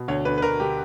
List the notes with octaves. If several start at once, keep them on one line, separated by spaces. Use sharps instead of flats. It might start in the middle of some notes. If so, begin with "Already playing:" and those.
Already playing: B2
D2 C#5
D2 B4
B4
D2 A#4
D3 G4